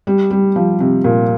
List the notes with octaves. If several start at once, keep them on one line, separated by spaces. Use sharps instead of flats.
G3
G3
F3
C3
A#2